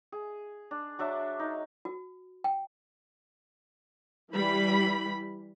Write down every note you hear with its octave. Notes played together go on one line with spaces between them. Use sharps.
G#4
D4
F#3 D4 E5
D#4
F#4
G5
E3 G3 B5